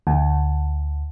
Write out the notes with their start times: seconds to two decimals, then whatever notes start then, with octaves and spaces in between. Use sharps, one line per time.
0.07 D2